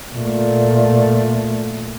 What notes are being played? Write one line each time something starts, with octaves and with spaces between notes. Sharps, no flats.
A#2 A3